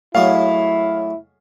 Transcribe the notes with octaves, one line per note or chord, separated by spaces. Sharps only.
A2 F#3 G#3 E4 F5